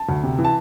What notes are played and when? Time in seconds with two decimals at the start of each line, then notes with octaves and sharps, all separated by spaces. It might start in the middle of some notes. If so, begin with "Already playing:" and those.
Already playing: A5
0.09 D2
0.23 C3
0.39 E3
0.45 A5